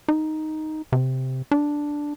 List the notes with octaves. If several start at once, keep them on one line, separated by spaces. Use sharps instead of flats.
D#4
C3
D4